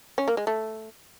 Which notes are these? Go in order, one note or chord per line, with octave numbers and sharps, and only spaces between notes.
C#4
A#3
G#3
A3